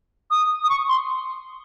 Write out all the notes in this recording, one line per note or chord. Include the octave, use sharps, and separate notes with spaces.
D#6
D#6
C#6
C6